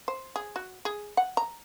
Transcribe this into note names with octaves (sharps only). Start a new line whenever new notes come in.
C5
G#4
F#4
G#4
F#5
A#5